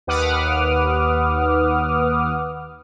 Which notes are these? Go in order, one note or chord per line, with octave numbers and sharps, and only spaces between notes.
D#2 B4 F#5 D6 D#6 F6